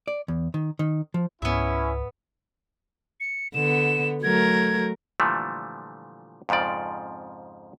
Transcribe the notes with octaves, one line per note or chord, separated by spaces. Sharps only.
D5
E2
D#3
D#3
F3
C#2 G#2 B3 C#4 E4 E5
C#7
D3 B3 E7
F#3 A3 A#4 G#6
A#2 D3 E3 F3 G3 A3
F2 G#2 C#3 F3 D5